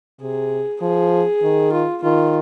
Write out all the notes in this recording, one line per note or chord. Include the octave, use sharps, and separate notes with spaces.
C3 G#4
F3 G#4
D#3
F4
D#3 F4